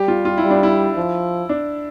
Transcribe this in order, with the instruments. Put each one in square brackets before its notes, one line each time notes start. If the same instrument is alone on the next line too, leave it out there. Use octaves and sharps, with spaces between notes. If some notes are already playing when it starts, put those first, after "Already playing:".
Already playing: [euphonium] G3 [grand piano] G4
[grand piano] F4
F4
E4
[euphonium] G3
[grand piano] D4
E4
[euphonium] F3
[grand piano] D4